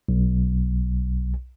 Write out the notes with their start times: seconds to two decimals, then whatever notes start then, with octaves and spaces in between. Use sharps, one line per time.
0.09 B1